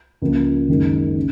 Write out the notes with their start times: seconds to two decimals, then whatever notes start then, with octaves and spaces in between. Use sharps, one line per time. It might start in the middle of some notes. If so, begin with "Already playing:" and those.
0.22 C#2 C#3 F3 A#3
0.69 F#1 F#2 D#3 G#3
1.17 C#3